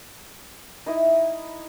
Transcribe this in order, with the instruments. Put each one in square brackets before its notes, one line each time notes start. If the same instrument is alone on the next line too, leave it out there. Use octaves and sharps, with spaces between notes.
[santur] D#4 E4 D#5